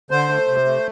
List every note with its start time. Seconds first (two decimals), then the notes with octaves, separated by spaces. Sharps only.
0.11 D3 C5
0.29 A3
0.48 C3
0.65 A3